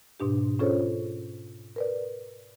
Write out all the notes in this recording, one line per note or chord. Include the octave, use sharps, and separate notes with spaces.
G#2 B2 D4 G4
C#4 F4 G#4 A4 C5 C#5
A#4 B4 D5